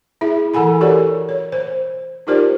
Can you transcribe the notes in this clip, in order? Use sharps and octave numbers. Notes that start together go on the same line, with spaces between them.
E4 G#4 E5
E3 A4 F#5 G#5 B5
F#4 G4 A4 A#4 C#5 D5
C#5
C5
D#4 F4 G4 A#4 C5 D5